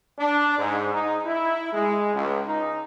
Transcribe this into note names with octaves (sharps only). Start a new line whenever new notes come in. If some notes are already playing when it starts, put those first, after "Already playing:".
D4
G#2
D#4
E4
G#3
C#2
D#4